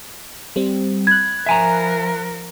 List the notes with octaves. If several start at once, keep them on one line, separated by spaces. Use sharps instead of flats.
G3 C4
B5 F#6 G#6
F3 A#4 E5 G#5 A#5